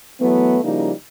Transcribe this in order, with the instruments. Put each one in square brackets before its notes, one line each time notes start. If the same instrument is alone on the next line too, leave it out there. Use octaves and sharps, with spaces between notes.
[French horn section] E3 F#3 A3 B3
C#3 F3 G3 A#3 D#4 E4